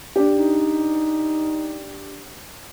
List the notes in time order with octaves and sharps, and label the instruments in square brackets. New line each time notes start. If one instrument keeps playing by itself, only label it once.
[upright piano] D4 G4
[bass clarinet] D#4